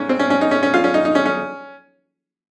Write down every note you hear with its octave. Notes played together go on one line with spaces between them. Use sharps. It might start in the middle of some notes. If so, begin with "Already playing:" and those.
Already playing: G#2 C#4
C4
C#4
C#4
D#4
C#4
C#4
F4
C#4
D#4
D#4
C#4
C#4